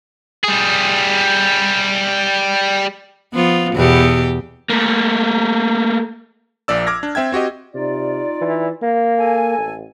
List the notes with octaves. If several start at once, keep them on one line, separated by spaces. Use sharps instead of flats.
G3 G#4
F3 B3 F4
E2 B2 G4
A3 A#3
A#1 A#2 D5 E6
D6 F6 G#6 A#6
D4
C4 E5 G5 G#6
C4 F#4 G4 D#5
C3 D#4 F4 D5
E3
A#3
A4 G#5
A1